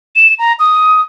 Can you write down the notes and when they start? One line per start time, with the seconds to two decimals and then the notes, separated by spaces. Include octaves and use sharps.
0.16 E7
0.39 A#5
0.59 D#6